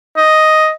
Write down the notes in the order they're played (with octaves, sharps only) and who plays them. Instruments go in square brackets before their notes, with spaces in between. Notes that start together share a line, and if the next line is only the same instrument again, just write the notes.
[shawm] D#5